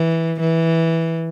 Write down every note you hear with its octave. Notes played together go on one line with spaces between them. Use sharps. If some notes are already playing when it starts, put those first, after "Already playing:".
Already playing: E3
E3